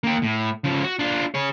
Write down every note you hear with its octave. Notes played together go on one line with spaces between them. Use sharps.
A#3 G5
A2
C#3 F3
F#4
D4 F4
G#4 C#5